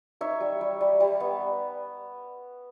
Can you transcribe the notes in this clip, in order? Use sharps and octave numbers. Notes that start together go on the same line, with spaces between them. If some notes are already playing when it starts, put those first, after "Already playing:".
D#4 C#5 E5
G3
G3
G3
G3
B3